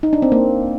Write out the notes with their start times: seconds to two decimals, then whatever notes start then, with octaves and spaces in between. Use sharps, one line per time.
0.03 D#4
0.13 D4
0.22 C4
0.32 A#3